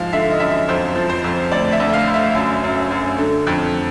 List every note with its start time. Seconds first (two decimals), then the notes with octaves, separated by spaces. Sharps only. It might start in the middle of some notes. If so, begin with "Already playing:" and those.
Already playing: G#2 F3 F5
0.12 D3 E5
0.31 D#5
0.40 F#2 E5
0.69 F2 C5
0.96 F3
1.10 C5
1.24 F2
1.51 D2 D5
1.72 E5
1.80 D2
1.93 F5
2.07 D2
2.14 E5
2.35 F#2
2.64 F#2
2.91 F#2
3.18 D3
3.47 F2